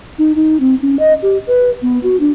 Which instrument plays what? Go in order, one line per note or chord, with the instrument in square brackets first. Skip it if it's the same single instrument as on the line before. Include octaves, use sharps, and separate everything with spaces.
[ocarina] D#4
D#4
C4
C#4
D#5
G4
B4
B3
F#4
D4